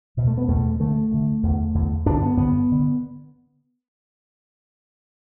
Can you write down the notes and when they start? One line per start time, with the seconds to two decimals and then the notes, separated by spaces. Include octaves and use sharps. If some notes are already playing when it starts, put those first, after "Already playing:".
0.17 E2 B2
0.27 A3
0.38 B3
0.48 E2 B2 A3
0.79 D2 D3 A3
1.11 D2 D3
1.43 E2 D3
1.75 E2 D3
2.06 G2 D3 D4
2.22 B3
2.37 G2 D3 B3
2.71 D3